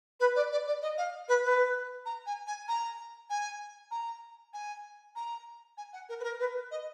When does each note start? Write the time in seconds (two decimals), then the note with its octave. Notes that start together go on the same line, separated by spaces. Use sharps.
0.20 B4
0.35 D5
0.51 D5
0.66 D5
0.82 D#5
0.97 F5
1.28 B4
1.44 B4
2.05 A#5
2.26 G#5
2.47 G#5
2.68 A#5
3.30 G#5
3.91 A#5
4.53 G#5
5.15 A#5
5.77 G#5
5.93 F#5
6.09 A#4
6.20 B4
6.23 A#4
6.39 B4
6.71 D#5